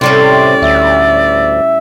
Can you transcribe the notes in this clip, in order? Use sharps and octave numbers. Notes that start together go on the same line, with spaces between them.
A2 C3 G3 C#4 D5 C6
D2 E5